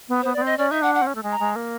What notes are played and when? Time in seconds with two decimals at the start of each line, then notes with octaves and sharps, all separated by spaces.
0.09 B3
0.21 C5
0.25 B3
0.33 D5
0.37 B3
0.42 C4 D#5
0.58 C#4 D5
0.70 D#4 E5
0.82 D4 F#5
0.94 F#5
1.02 C4
1.07 C#4
1.15 A3
1.23 G#3
1.31 A#5
1.40 G#3
1.56 A#3